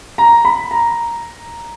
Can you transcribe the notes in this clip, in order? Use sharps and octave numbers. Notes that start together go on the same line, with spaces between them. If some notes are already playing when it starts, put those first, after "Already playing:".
A#5
B5
A#5